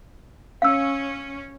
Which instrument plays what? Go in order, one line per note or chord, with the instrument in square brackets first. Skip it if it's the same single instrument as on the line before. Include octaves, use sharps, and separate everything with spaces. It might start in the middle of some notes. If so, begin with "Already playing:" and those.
[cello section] C#4 [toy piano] F5 E6